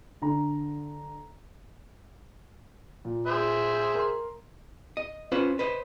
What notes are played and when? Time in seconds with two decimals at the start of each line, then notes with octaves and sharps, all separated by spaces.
0.22 D3 A#5
3.05 A#2
3.26 G#4 C5 E5
3.95 A#4 C6
4.97 D#5
5.32 C#4 F4 B4 C5
5.59 B4 C5 D#5